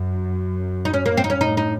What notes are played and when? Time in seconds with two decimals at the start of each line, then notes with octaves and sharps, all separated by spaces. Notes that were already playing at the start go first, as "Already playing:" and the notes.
Already playing: F#2
0.85 D#4
0.94 C#4
1.06 A#3
1.17 C4
1.24 D#4
1.30 C#4
1.41 A2 D#4
1.57 D#4